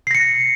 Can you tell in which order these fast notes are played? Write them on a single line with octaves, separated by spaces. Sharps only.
C7 A#6 C#7